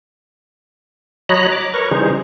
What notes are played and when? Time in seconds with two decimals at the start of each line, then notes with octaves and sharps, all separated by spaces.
1.29 F#3 C#5 D#5 A#5 B5 F#6
1.52 D6
1.74 A#4 B4 C#5 A#5 C#6
1.91 C#3 E3 G3 D#4 G#4 C5